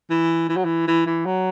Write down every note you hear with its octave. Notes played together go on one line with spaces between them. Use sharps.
E3
E3
F#3
E3
E3
E3
F#3